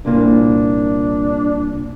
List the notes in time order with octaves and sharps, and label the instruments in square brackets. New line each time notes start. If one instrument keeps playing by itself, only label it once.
[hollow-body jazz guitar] C2 A#2 A#3 [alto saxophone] D4